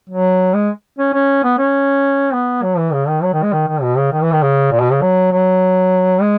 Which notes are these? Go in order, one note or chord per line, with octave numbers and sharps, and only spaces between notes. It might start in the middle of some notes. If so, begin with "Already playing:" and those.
F#3
G#3
C#4
C#4
B3
C#4
B3
F#3
E3
C#3
D#3
F#3
D#3
G#3
D#3
D#3
B2
C#3
D#3
E3
D#3
C#3
A#2
B2
C#3
F#3
F#3
G#3